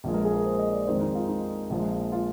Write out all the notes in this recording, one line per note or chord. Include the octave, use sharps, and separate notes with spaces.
A#1 A#2 F3 G#3
A#4
G#4
A#4
C5
D#5
D5
F2 D#3 G#3 C5
D#4
F4
D#4
A#1 A#2 F3 G#3
F4